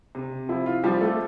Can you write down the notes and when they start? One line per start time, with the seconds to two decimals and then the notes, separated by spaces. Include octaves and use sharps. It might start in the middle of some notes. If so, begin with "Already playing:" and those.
0.15 C3
0.49 F3 E4
0.66 F4
0.84 F3 G3 G4
1.01 A3 A4